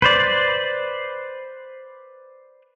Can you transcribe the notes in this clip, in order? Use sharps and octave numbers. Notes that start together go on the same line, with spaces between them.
B4 C5 D5